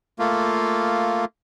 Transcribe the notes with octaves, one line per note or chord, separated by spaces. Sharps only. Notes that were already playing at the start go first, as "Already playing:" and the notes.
A3 A#3 F4